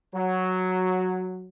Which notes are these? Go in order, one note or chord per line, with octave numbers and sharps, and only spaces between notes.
F#3